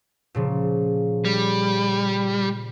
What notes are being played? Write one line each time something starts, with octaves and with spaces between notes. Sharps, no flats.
A#2 C#3 F3
G3